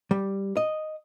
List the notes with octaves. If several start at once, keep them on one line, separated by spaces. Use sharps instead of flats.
G3
D#5